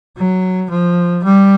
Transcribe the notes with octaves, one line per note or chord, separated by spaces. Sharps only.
F#3
F3
G3